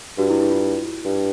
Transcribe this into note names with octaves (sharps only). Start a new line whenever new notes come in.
G2 F#4
E4
E4
F4
G2